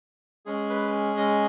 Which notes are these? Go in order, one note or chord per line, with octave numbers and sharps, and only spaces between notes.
G#3 C#4 G#4
B4
D#5